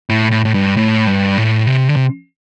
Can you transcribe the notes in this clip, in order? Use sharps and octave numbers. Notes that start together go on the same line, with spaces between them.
A2
A2
A2
G2
A2
G2
A2
C3
D3
C3